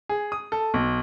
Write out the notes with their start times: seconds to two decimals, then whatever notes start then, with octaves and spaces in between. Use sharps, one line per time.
0.09 G#4
0.32 D#6
0.52 A4
0.74 B1